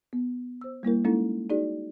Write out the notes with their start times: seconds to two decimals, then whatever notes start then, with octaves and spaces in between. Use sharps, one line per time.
0.13 B3
0.61 C5 E6
0.83 G3 A#3 E4 A#4
1.05 G#3 A#3 C#4 D#4 E4 A4
1.50 D#4 F#4 G#4 D5